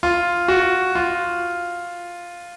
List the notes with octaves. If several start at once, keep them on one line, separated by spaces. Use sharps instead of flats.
F4
F#4
F4